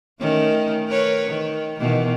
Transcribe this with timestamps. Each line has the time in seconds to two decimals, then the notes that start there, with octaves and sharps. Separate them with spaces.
0.20 D#3 A3 C#4
0.88 A#4 B4 C#5
1.27 D#3
1.79 B2 D#3 E3